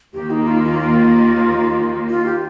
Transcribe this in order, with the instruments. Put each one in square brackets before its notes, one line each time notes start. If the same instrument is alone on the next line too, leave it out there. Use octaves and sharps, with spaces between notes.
[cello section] D#2 D#3 A#3 [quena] G4
[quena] D#4
F4
F4
F4
F4
G4